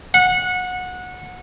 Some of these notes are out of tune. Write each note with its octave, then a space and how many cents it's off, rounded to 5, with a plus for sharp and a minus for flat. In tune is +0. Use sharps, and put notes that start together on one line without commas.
F#5 -20